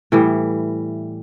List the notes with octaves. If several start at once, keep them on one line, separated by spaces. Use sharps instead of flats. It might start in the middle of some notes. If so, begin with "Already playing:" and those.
A2 E3 G3